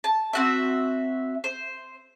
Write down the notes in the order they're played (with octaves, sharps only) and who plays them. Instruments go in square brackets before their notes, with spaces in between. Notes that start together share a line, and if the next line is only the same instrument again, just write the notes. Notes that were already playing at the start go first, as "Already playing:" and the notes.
[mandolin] A5
C4 F#4 E5
C5